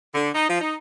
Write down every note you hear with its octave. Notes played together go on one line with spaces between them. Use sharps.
D3
D#4
F3
D#4